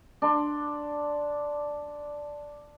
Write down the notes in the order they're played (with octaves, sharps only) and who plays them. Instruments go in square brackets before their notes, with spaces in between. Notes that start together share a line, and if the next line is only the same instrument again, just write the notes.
[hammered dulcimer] D4 C6